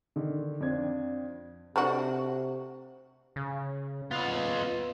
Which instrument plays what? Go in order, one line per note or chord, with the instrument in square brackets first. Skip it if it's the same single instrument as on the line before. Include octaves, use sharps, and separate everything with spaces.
[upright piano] D3 D#3
F2 C4 D4 G#6
[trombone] C3 [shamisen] A3 D4 F#4
[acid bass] C#3
[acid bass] B3 [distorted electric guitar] F4 D#5